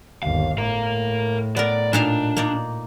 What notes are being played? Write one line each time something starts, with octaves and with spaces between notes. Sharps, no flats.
G1 D#2 F5
A2 A#4 F5
B3 A#4 D5
A#2 D4 D#4 F5
A#3 D#4 D5